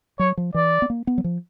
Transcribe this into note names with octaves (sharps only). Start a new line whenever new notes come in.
F#3 C#5
F3
E3 D5
B3
A#3
B3
F#3
F3